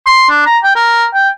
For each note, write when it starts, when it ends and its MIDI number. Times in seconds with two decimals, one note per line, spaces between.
0.06 0.26 84
0.30 0.41 62
0.46 0.58 82
0.64 0.73 79
0.76 1.05 70
1.14 1.29 79